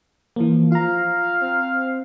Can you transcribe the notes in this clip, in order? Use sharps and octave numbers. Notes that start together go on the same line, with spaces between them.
E3 F3 A#3
F4 F5 A#5
C4